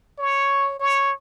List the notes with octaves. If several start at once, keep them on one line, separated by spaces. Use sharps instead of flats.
C#5
C#5